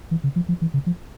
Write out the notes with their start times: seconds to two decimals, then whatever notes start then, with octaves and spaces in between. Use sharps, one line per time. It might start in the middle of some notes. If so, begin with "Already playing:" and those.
0.11 E3
0.24 C#3
0.36 F3
0.49 F3
0.62 E3
0.74 C#3
0.86 F3